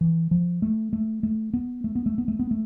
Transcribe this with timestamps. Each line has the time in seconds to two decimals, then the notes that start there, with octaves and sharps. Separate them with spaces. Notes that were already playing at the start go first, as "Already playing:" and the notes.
0.01 E3
0.31 F3
0.62 A3
0.93 A3
1.23 A3
1.54 B3
1.84 A3
1.95 B3
2.06 A3
2.18 B3
2.28 A3
2.39 B3
2.51 A3